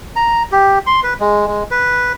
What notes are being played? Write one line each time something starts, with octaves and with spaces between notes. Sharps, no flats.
A#5
G4
C6
B4
G#3
G#3
B4